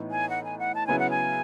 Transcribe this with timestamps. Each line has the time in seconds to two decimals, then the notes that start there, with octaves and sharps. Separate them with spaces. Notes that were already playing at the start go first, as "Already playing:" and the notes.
Already playing: A2 E3 B3 D#4
0.11 G#5
0.30 F#5
0.44 G#5
0.59 F#5
0.75 A5
0.87 C#3 F#3 B3 E4 G#5
0.99 F#5
1.10 G#5